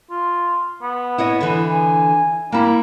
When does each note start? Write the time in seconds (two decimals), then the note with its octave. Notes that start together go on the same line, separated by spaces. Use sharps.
0.10 F4
0.82 B3
1.18 E4 C#5 D#5
1.41 D3 E3
1.70 G#5
2.52 G3 A#3 E4